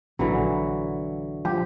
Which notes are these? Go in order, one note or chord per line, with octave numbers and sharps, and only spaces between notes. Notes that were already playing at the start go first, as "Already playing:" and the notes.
A#1 D3 E3 F#3
F3 G4